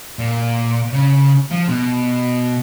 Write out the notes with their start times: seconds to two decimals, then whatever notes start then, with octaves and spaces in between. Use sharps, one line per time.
0.19 A#2
0.93 C#3
1.51 F3
1.68 B2